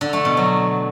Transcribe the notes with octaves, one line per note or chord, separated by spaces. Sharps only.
D3
A3
B2
F#3